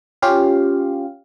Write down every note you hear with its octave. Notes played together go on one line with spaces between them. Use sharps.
C#4 F4 G4 F5